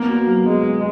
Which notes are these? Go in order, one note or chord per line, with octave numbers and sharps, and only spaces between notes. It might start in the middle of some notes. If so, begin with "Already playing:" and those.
Already playing: A#3 B3
F#4
F#3
G#3 B3
B3